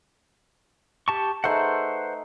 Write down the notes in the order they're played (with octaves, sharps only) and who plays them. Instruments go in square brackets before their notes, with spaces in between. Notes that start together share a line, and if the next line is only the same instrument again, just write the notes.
[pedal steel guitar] G4 A5 C#6
[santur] A3 D#4 G#4 [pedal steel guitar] B4 C5 F#5